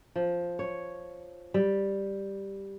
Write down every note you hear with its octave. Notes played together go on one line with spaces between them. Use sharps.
F3
C#5
G3